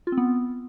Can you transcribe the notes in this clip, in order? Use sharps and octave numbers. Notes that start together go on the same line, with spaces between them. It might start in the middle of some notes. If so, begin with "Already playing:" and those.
F4
C4
B3